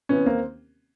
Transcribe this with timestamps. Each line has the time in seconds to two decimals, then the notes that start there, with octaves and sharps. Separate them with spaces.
0.09 C3 E3 B3 C#4
0.25 D#2 A#3 C4